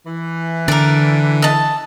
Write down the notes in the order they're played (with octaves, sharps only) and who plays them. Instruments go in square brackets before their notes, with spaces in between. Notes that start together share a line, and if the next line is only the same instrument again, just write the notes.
[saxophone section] E3
[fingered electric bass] D3 [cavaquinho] A#4 D5
[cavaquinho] D#5 A5